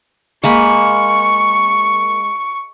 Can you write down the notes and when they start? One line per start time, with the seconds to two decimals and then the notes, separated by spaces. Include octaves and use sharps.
0.44 G#3 A#3 B5 C#6